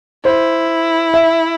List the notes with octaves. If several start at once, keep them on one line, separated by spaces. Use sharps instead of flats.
E4 C5
E5